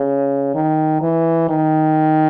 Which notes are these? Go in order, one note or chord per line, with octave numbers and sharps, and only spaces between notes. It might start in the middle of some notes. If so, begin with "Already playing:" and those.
Already playing: C#3
D#3
E3
D#3